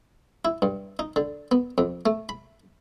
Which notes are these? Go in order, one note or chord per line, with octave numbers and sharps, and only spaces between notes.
E4
G2
D#4
D3
B3
F2
A3
B5